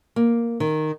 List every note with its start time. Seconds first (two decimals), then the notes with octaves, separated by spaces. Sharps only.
0.16 A#3
0.60 D#3